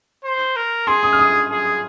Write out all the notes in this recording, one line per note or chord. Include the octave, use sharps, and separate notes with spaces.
C5
A#4
G#4 C6
D#6
F6
D#6
G#4